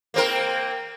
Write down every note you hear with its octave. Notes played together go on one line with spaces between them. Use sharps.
A#3 C4 A#4